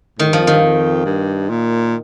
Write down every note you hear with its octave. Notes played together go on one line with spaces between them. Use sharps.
A2 D#3
G2 F3
F2
G2 D#3
F2
G2
A#2